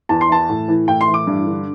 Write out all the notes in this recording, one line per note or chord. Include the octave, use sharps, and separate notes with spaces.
E2 A5
C6
E3 A5
A2
E3
A2 G5
C6
E3
D6
G2
D3